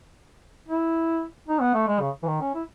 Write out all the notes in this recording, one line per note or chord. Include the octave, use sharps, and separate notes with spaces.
E4
D#4
B3
A3
G#3
C#3
E3
D#3
C#4
E4